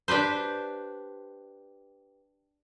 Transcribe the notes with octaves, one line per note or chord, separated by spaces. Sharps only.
D4 G4 B4 C5